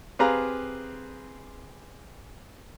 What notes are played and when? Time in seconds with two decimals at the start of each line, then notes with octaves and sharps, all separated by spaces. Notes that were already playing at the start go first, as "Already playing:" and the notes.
0.19 C4 G4 G#4 B4 F5 A#5